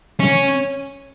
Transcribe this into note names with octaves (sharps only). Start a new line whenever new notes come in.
C#4